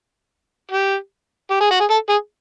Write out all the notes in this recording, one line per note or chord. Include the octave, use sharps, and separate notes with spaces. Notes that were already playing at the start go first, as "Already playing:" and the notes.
G4
G4
G#4
F#4
G#4
A4
G#4